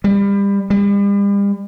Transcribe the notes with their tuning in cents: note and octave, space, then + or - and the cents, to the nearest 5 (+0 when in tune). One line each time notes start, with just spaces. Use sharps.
G3 +30
G3 +40